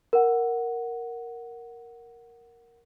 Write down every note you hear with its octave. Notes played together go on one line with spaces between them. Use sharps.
A#4 F#5